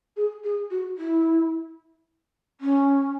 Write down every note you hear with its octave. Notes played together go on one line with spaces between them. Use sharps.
G#4
G#4
F#4
E4
C#4